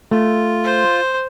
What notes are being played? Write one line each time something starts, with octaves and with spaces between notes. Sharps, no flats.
A3 F4
C5